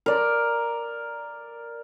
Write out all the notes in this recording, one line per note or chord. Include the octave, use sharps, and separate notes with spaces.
A#4 D5